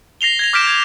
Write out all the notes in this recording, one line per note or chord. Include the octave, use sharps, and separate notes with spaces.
A#6 C7 F7 G7
G#6 A#6 F7
D6 F6 G6 B6 D7 E7
G#6